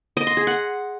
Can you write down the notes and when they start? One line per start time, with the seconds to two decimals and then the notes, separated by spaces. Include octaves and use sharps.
0.17 D#5
0.27 C6
0.37 G#4
0.47 F#5